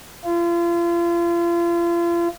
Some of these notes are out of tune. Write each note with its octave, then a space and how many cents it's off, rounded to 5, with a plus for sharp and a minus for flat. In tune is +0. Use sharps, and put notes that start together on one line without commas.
F4 -35